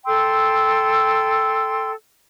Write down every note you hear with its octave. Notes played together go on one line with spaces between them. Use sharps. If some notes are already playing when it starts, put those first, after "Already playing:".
A4 G5 C6 E6